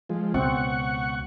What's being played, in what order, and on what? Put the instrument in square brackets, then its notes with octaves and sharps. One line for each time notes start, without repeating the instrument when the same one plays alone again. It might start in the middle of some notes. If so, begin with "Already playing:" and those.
[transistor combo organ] F3 G#3
[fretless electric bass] C#2 B2 [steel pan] C4 [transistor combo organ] F#5 C#6